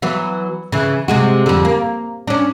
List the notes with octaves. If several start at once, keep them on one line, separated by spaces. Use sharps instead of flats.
E3 F#3 B3
C#3 E3
C3 G#3 F#4
F2 D3
A#3
C#4 D4